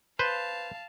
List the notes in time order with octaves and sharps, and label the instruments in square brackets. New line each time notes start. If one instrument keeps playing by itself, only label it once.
[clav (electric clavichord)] B4 C5 [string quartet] F5 A5